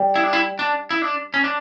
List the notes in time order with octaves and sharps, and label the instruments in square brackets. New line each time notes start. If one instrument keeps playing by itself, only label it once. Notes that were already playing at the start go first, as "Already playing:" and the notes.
Already playing: [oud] G3
[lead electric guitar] E4
D4
E4
D4
E4
D4
C#4
D4